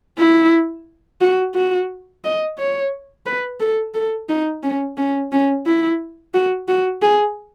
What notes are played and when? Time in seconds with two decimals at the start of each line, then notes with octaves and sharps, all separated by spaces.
0.19 E4
1.21 F#4
1.55 F#4
2.24 D#5
2.58 C#5
3.26 B4
3.60 A4
3.94 A4
4.29 D#4
4.63 C#4
4.97 C#4
5.32 C#4
5.66 E4
6.34 F#4
6.68 F#4
7.02 G#4